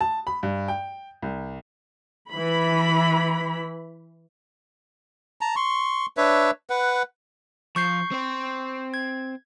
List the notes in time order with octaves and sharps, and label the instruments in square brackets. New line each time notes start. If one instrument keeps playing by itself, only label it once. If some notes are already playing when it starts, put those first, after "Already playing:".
[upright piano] A5
B5
G2
G5
C2
[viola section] E3 B5
[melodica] A5 A#5
C6 C#6
D4 B4 C#5 E5
B4 F#5
[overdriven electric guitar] F3 [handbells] C#6 G6 C7
[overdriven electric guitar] C4 C5
[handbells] G#6